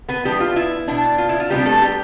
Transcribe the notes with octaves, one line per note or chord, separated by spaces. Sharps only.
B3 B4
E3 G3 B3 D4 G4
F4
E4
B2 B3 D4
F4
E4
F4
C3 F3 G3 B3 D4 G4
A3 A4
G3 G4